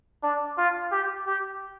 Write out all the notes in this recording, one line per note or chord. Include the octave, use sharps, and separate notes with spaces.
D4
F4
G4
G4